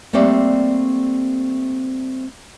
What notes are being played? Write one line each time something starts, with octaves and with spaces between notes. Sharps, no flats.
G3 A3 A#3 C4 D5